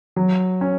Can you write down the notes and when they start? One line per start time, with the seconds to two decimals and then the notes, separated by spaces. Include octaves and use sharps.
0.16 F#3
0.61 C#4